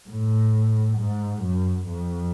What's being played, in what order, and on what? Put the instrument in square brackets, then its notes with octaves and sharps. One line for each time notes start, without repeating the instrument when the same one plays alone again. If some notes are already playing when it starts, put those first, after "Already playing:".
[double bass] A2
G#2
F#2
F2